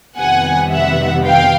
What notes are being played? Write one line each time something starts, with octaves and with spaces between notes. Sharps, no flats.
F2 C3 D#3 G3 B3 F#5 G#5
E5 F#5
F5 G5